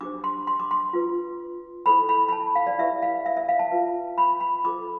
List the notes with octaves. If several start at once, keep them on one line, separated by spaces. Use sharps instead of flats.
D4 G4 C5 D6
C6
C6
D6
C6
F4 B4
E4 A4 C5 B5
B5
B5
A5
F5
D5
E4 G4 B4 E5
F5
E5
E5
F5
A5
F4 B4
B5
B5
F4 A4 C5 D6